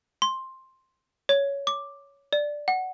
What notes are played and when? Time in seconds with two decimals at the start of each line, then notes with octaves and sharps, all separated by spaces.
0.22 C6
1.29 C#5
1.67 D6
2.33 D5
2.68 F#5